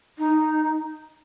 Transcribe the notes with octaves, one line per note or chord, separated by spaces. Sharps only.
D#4